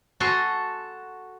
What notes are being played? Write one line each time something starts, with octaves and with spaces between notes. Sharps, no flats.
F#4 A4 G#5 A#5 C6